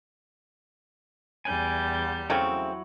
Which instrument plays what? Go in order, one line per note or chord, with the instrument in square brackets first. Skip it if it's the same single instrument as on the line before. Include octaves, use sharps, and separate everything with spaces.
[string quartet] E2 G3 G6 [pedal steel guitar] G#5
[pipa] C#3 A3 C4 [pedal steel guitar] F#3 E4 C#6